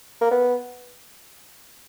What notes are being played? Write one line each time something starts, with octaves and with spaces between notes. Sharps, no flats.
A#3
B3